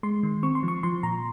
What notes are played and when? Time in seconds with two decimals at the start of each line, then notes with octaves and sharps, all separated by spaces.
0.03 G#3 C6
0.23 D#3
0.43 C4 C#6
0.55 C6
0.63 F3
0.68 C#6
0.83 F3 C6
1.03 A#2 A#5